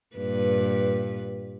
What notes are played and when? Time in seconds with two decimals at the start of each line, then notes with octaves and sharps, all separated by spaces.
0.16 G2 A#2 B4